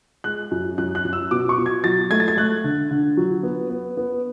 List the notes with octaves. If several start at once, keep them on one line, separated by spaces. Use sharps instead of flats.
G#3 F#6
F#2
F#2 F#6
F#6
F#2
E6
B2 D6
C#6
B2
G#6
F#3 A6
A3 G#6
A6
G#6
A3 F#6
D3
D3
F#3
B3
B3
B3